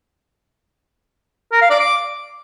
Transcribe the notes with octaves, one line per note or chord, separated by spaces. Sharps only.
A#4
F5
D5
D6